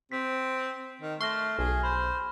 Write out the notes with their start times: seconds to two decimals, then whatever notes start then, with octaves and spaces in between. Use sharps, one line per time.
0.12 C4 B6
1.02 D#3
1.20 A3 C6 C#6 F6 A#6
1.59 B1 G#4
1.83 C5 B5